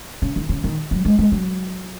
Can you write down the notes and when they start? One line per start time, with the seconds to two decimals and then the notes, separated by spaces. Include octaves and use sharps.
0.22 C#3
0.36 D#3
0.49 C#3
0.64 D#3
0.91 F#3
1.05 G#3
1.19 G#3
1.32 F#3